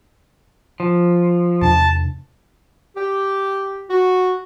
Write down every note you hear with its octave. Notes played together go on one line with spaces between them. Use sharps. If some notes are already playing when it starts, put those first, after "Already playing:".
F3
E2 C3 D4 A5
G4
F#4